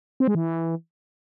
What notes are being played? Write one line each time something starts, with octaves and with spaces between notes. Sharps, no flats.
C4
G#3
E3